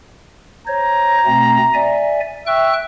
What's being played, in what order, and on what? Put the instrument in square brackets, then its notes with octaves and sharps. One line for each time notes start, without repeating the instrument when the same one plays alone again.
[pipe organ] C5 C#5 [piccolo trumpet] A#5
[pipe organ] B2 A3 C4
D5 E5 G#5
[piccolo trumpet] E5 [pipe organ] G5 C#6 F#6